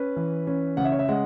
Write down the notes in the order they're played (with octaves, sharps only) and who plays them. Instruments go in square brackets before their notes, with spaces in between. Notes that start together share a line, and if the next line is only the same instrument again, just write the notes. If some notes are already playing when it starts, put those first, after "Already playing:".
Already playing: [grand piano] C#4 B4
E3
C#4
C#3 F#5
E5
C#5
E5
G#3 F#5